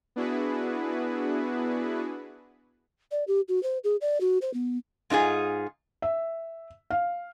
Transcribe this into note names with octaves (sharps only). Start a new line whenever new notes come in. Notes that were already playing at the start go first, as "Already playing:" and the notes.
B3 D4 E4 F#4 G#4 B4
D5
G4
F#4
C5
G#4
D5
F#4
C5
B3
G#2 D#4 F4 G#4
E5
F5